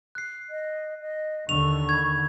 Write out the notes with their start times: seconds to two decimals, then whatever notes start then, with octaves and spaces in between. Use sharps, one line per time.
0.15 F#6 C7
0.50 D#5
1.00 D#5
1.49 D#2 D3 D#3 C#6 F7
1.89 B5 G#6